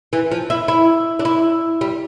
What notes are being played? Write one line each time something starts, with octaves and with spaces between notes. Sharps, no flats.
E3
F3
E4
E4
D4
E4
G3